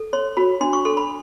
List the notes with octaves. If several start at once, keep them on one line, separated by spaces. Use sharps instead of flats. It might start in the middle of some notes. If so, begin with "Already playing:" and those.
Already playing: A4
C#5 C6
F#4 B5
D4 C6
C#6
A4 C6
B5